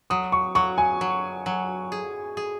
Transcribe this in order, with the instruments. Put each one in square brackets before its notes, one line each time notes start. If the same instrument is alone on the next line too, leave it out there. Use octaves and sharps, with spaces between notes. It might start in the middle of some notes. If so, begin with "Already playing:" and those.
[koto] F#3 [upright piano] D#6
[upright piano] C#6
[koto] F#3 [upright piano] C#6
[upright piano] G#5
[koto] F#3
F#3
G#4
G#4